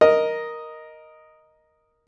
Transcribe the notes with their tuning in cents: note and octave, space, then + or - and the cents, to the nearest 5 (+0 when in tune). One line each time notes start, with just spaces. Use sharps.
A#4 +5 D#5 +0